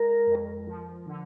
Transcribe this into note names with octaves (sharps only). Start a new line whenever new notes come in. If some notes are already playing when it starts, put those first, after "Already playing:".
Already playing: G#3 A#4
F2
F3
D3